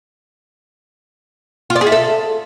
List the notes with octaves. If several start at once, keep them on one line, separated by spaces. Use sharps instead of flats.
F4
D5
G#4
E4
A4